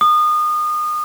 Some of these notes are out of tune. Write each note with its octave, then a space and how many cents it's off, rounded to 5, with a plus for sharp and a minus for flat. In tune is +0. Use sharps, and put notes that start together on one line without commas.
D#6 -30